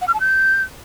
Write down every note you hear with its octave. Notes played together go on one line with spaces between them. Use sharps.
F#5
F6
A5
G6